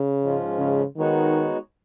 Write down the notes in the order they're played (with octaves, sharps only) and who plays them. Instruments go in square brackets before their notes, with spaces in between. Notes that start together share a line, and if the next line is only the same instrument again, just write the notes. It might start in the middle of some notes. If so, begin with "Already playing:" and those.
Already playing: [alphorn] C#3
[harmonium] G#2 F3 G#3 C#4 F4
[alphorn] C#3
[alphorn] D#3 [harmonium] G#3 B3 D#4 F#4 C#5